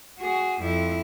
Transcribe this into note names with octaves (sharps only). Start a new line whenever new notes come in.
F#4 G#4
F2 E4